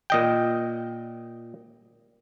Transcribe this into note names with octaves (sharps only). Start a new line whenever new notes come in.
A#2 D#5 G5